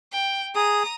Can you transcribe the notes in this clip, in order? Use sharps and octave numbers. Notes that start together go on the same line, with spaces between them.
G5
G#4 A#5 D#6